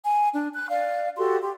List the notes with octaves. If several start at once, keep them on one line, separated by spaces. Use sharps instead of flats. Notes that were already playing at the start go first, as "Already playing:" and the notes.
G#5
D4
F#6
D5 F5
F#4 G4 A4 C6
G4 C6